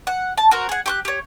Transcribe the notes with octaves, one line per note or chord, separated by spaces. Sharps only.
F#5
A5
F#4 A#4 C5
G#4 F#5
G4 C#6 F#6
G4 C#5